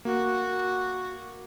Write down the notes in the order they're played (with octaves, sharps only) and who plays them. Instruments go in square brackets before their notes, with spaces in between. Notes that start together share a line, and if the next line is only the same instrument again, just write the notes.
[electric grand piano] A#3 [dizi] F#4